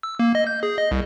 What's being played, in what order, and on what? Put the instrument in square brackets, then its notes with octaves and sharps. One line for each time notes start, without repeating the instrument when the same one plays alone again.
[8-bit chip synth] E6
A#3
D#5
G6
G#4
D#5
C2